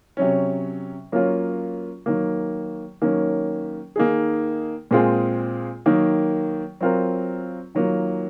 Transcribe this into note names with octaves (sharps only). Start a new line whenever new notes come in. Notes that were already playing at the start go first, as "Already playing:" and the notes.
C3 F#3 C#4
F#3 A#3 C#4 F4
D#3 F#3 A#3
D#3 F#3 A#3 C#4
D#3 A#3 D#4 G#4
A#2 G#3 C4 F4 G#4
D#3 F#3 A#3
F#3 C4 F4 A#4
D#3 F#3 A#3 F4